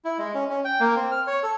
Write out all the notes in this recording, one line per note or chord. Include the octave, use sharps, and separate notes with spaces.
E4
G#3
C#4
C#4
G5
A#3
C4
F6
C#5
A4